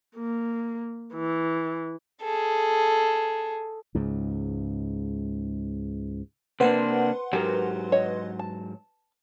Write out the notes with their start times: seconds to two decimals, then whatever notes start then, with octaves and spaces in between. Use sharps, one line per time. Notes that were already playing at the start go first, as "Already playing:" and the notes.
0.16 A#3
1.14 E3
2.22 G#4 A4
3.95 C#2 G#2
6.60 C3 A#3 D4 B4 C5 F#5 C6
7.33 G#2 F#3 G4 A#4
7.92 C#5 D#5
8.39 A5